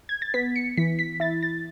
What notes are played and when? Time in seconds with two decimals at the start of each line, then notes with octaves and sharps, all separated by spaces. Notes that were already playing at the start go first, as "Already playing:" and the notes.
0.09 G#6
0.22 A6
0.34 B3 B6
0.56 C#7
0.77 E3 B6
0.99 B6
1.20 E4 A6
1.43 A6